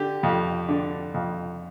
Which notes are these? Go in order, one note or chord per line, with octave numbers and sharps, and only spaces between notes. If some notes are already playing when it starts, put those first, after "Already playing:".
Already playing: D3 G4
F2
D3
F2